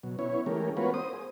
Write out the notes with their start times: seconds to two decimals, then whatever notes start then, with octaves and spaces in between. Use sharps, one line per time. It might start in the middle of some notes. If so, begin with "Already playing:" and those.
0.03 B2 F#3
0.19 B3 C#4 E4 C#5
0.46 E3 G#3 A3 C#4 G4 A#4
0.77 B3 F4 F#4 A#4 B4 C#5
0.94 C5 D#6
1.13 G#4